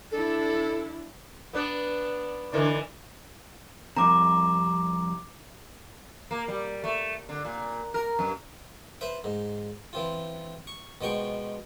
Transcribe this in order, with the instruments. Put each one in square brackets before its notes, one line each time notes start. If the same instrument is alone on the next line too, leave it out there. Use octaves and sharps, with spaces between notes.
[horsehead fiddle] D4 E4 [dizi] A4
[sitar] B3 D4 B4
D3 E3 D4
[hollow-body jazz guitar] C2 F2 C3 [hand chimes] A#5 D6
[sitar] A#3
G3
A3
D3
A#2
A#4
F#2
[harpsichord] B4 C5 E5
G#2
E3 C4 F4
C#6
B2 F3 G#3 G5 C#6